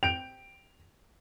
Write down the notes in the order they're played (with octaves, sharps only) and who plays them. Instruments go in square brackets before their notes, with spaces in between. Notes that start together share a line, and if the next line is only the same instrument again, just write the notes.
[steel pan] G5 [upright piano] D7 F7